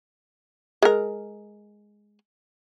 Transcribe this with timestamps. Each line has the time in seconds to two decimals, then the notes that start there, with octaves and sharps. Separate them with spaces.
0.83 G#3 A#4